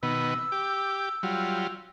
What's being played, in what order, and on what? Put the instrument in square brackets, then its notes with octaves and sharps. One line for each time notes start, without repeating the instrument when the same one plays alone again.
[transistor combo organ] B2 D#3 B3 [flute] E6
[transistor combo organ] G4 D6
F#3 G3 F4